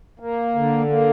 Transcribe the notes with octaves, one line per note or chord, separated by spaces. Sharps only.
A#3
D3
A#3